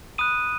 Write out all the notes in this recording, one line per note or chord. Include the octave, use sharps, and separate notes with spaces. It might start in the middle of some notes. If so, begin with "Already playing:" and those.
B5 D#6 F#6 D#7